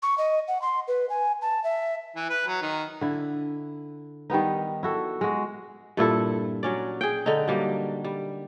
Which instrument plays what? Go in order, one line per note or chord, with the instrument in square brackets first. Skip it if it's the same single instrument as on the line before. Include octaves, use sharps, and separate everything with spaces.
[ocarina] C#6
D#5
F#5
C6
B4
G#5
A5
E5
[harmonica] E3
B4
F#3
D#3
[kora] D3 E4
D#3 G3 B3 D#4
E4 F#4 A4
G#3 F#4
G2 A#2 E4 A4
F#3 C#4 D5
G#4 G5
D3 D#4
F#3 G3 A#3
G3